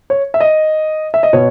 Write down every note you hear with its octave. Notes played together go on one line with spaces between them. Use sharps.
C#5
E5
D#5
E5
D#5
B2 C#5